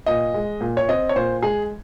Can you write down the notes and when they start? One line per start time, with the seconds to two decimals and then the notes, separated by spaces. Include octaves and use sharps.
0.06 A#2 D#5
0.34 G#3
0.61 A#2
0.77 C#5
0.89 C4 D#5
1.09 C#5
1.16 A#2 C5
1.42 G#3 G#4